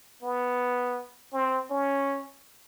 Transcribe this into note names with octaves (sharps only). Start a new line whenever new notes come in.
B3
C4
C#4